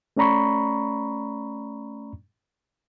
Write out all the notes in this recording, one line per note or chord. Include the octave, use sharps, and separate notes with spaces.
A3 C#4 D5 A#5 B5 C#6